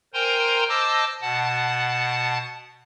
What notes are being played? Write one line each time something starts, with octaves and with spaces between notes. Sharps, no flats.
A#4 C5 G5 G#5 A#5 C6
C5 D#5 A5 D6 E6
B2 F#5 A5